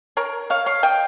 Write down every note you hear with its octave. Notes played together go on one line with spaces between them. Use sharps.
A#4 C#5
C#5 F5
C#5 F5
D#5 G5